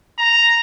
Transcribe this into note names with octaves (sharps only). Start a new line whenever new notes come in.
A#5